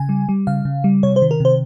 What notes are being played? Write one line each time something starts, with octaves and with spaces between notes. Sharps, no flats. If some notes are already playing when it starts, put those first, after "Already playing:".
Already playing: C#3 G#5
G3
G3
C#3 F5
C#3
G3
C3 C#5
C5
D#3
A#4
C3 C5